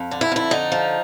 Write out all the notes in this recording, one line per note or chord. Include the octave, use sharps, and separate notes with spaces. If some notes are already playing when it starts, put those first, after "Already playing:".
Already playing: F2
D3
E4
F2 E4
D3 D#4
F3